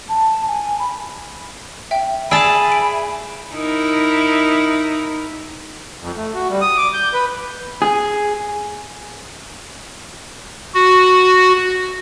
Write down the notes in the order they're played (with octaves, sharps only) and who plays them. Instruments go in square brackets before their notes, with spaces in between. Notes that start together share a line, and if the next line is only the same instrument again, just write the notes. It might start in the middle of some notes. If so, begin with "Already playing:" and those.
[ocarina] A5
G#5
B5
[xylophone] E5 G5
[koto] G#4 A5 [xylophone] D5 E6 D7 [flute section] E5 G#5 B5
[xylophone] D7
[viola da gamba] D#4 E4 A#4
[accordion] F2
A3
F#4
G3
D#6
D6
G6
B4
[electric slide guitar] G#4
[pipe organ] F#4